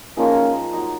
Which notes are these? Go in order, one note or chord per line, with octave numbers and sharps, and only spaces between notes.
F3 G#3 A#3 C#4 D#4 A#4
F#3 A#3 D#4